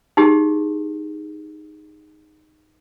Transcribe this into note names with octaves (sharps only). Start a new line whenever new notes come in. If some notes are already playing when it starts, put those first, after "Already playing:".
D#4 G4 G#4